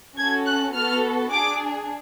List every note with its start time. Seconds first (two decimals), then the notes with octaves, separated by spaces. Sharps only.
0.17 C#4 F#4 A4 G#6
0.46 F#6
0.74 B3 F#4 A4 F6
1.32 D4 G#4 D6